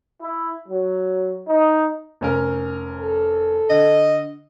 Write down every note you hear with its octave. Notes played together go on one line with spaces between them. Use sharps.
E4
F#3
D#4
F1 C#4 A#4
A4
D3 D#5